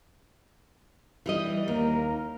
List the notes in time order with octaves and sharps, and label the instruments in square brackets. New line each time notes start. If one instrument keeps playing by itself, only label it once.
[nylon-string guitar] E3 G3 D#5
[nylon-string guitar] D#2 [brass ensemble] A#3 A#4